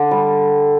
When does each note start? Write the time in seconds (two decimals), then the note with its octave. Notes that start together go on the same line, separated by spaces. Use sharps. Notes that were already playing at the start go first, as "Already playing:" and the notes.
Already playing: D3 D4
0.11 G3